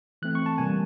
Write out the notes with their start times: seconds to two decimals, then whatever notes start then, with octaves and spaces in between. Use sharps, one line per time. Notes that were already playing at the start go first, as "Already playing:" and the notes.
0.22 E3 A3 C4 F#6
0.35 C#6
0.46 A5
0.58 C3 E3 G3 A#3 G#5